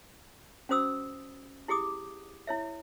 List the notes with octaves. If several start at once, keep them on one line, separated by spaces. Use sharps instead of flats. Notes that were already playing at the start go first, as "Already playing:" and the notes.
C#4 F#4 C5 D#6 E6
E4 G4 G#4 D6 D#6
E4 C#5 E5